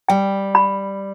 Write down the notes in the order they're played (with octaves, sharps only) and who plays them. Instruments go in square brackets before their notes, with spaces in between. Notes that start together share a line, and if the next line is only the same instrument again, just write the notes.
[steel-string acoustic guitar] G3 [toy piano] G5
[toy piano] B5